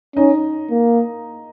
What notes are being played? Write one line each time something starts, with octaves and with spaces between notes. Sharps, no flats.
C#4 D#4
A#3